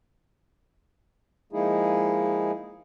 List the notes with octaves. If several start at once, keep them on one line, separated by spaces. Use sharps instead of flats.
F3 G#3 A#3 D#4 E4 G#4